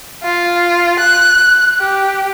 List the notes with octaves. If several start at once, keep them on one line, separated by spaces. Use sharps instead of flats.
F4
F#6
G4